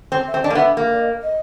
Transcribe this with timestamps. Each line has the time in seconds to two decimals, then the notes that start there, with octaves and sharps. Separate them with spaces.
0.12 C4
0.27 E5
0.34 C4
0.41 D#5
0.44 D4
0.50 A#3
0.55 B3 E5
0.77 A#3
0.91 D5
0.99 D#5
1.21 D#5